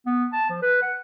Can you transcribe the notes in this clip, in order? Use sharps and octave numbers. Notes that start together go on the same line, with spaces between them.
B3
A5
F3
B4
F#5